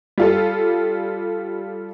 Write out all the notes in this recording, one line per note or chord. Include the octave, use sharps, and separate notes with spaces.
G3 F4 A4